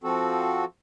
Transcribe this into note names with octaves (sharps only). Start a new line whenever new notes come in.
F3 C4 F#4 A4